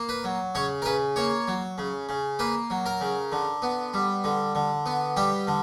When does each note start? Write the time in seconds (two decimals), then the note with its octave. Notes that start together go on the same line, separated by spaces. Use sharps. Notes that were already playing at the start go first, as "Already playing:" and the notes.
Already playing: A#3
0.09 B4
0.24 F#3
0.55 C#3 C#5
0.82 A#4
0.85 C#3 B4
1.16 A#3 C#5
1.48 F#3
1.78 C#3
2.09 C#3
2.39 A#3 B4
2.70 F#3
2.86 A#4
3.01 C#3
3.32 D3
3.62 B3
3.94 G3
4.24 D3
4.55 D3
4.86 B3
5.17 G3 G4
5.47 D3